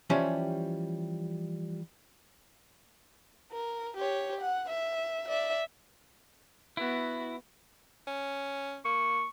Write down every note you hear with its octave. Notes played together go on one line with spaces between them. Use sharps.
E3 F3 G3 C#4 G4
A#4
G4 C#5
F#5
E5
D5 E5
B3 E4 F#4
C#4
A#3 C#6